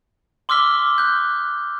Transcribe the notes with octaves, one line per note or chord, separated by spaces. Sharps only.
C6 D6 E6 F6 B6 G7
F#6 G6